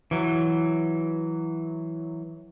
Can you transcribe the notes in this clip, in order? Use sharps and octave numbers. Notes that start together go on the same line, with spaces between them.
E3 F#3